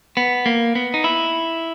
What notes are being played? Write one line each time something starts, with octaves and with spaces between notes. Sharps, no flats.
B3
A#3
B3
D#4
E4